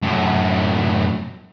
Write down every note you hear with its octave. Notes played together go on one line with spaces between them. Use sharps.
F#2 A2